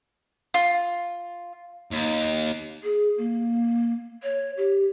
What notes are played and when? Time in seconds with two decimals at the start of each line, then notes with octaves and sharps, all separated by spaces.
0.54 F4
1.91 D#2
2.83 G#4
3.17 A#3
4.23 C#5
4.57 G4